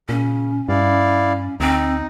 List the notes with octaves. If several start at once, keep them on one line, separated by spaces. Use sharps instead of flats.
A#2 C#3 C#4
G2 E4 D5 F5
D2 C4 D#4